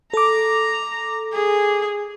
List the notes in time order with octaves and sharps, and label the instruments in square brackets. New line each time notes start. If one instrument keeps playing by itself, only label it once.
[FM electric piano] A4 D6 [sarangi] A#5
[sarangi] G#4